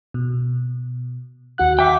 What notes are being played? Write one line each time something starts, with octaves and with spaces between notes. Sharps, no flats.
B2
D#2 F#4 F#5 F#6
E5 G5 D6